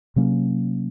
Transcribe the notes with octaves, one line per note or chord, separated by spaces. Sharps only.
C3 F#3 A#3 C#4